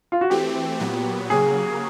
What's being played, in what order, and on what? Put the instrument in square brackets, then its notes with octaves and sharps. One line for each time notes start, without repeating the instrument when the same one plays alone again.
[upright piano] F4
F#4
[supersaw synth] E3 A3 C4 [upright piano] G4
[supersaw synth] A#2 F#3 B3
[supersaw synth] C#3 F#3 A#3 [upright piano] G#4